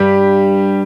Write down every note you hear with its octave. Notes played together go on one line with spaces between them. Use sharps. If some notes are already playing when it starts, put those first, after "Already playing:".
Already playing: G2 G3 G4